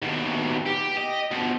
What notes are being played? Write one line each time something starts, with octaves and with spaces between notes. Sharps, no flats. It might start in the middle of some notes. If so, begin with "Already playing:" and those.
D#2 B2
G4
D#5
B2 F3